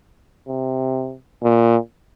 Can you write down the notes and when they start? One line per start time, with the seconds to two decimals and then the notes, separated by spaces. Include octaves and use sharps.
0.48 C3
1.43 A#2